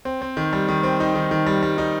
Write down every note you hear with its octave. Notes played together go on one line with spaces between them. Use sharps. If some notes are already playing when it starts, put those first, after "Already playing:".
C4
C4
D#3
G3
D#3
C4
D#4
D#3
D#3
G3
G3
D#4